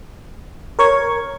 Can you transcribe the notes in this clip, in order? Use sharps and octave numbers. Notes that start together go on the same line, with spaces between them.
A#4 C#5 C#6 G#6